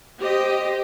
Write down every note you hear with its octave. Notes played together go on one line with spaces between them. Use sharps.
G4 C5 D#5